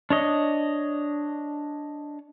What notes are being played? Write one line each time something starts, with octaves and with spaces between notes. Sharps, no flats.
D4 C#5 D#5